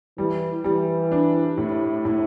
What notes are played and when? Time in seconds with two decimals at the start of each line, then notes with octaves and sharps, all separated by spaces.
0.18 E3 G3
0.64 E3 G3
1.12 D4
1.57 A2
2.05 A2